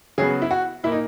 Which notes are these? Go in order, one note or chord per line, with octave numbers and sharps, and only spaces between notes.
C#3 F#3 B3 G#4
E4
F#4
A#2 A#3 D#4 E4